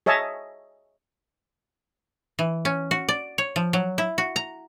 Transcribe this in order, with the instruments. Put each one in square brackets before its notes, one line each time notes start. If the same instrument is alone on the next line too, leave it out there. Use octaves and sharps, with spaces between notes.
[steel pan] G#4 C#5 D#5 E5 A5
[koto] E3
C#4
F#4
D5
C#5
F3
F#3
E4
F#4
A#5